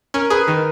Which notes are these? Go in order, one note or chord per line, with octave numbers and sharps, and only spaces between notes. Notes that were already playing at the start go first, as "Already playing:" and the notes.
C#4 A#4
G#4 B4
D#3 A#4